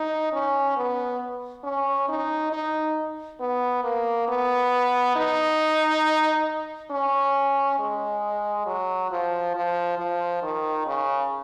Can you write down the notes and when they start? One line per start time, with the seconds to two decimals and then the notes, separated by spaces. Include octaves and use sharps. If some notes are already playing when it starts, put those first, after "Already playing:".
Already playing: D#4
0.33 C#4
0.77 B3
1.64 C#4
2.09 D#4
2.52 D#4
3.40 B3
3.84 A#3
4.28 B3
5.16 D#4
6.91 C#4
7.79 G#3
8.66 F#3
9.11 F3
9.55 F3
9.98 F3
10.43 D#3
10.86 C#3